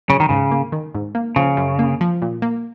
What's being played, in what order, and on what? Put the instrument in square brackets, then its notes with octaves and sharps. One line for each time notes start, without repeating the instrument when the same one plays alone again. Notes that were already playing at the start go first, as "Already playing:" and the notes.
[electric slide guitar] C#3 [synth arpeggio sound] F#3
[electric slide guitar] D#3
[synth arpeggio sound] G#2 [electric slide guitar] C#3
[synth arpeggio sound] A#3
D#3
G#2
A#3
[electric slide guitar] C#3 [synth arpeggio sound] F3
[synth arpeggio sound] F#2
A#3
F3
A#2
A#3